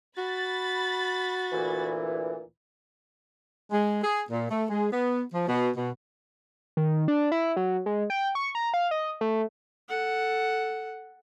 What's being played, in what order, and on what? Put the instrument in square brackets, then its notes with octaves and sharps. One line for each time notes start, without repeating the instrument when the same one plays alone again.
[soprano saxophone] F#4 [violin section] B5 A6
[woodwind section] D2 A#2 E3
[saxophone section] G#3
G#4
A#2
A3
G#3
B3
F3
B2
B2
[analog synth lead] D#3
D4
E4
F#3
G#3
G5
C#6
A#5
F5
D#5
A3
[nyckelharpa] A4 F#5